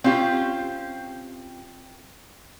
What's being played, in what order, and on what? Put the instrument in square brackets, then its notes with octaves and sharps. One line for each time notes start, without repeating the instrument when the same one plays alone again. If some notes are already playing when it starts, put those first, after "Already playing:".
[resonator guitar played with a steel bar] C4 C#4 F4 G4